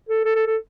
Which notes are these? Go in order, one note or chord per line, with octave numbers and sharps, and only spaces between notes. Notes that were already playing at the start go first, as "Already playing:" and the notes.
A4
A4
A4
A4